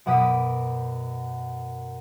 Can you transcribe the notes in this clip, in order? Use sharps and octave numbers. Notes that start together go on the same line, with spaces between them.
F#2 B2 F#5 D6 D#6 B6